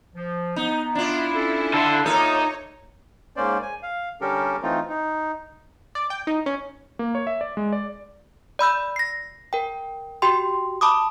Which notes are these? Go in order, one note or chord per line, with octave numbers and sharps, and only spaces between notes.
F3
B3 D#4
D4 E4 F4
C#4 A4
D3 A4 B4 F5 C6
A#3 D#4 F4 A4 C#5 E5 D#6
G#2 A#3 C#4 C5 D5
G#5
F5
D3 G3 C#4 G4 A4 A#4
E3 A3 C4 D#4 F4
D#4
D5
G5
D#4
C#4
A#3
C#5
E5
D5
G#3
D5
D5 B5 E6 G6
A#6 C7
A#4 G5
F#4 G4 G5 C6
A5 B5 D6 D#6